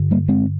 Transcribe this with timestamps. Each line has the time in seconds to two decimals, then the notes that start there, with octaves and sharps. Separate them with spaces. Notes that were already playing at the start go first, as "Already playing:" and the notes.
Already playing: G2 D3
0.11 G3 A#3
0.28 G#3 C4